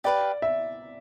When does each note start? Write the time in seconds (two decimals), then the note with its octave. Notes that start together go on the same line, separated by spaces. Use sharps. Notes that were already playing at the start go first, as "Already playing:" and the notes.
0.04 G4 B4 D5 F5
0.42 E5